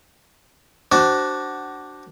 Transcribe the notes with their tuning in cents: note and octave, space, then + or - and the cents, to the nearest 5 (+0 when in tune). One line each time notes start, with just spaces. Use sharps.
D4 +0 F#4 +25 C5 +0